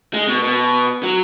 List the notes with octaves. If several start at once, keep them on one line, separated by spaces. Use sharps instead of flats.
G#3
B2
B2
F#3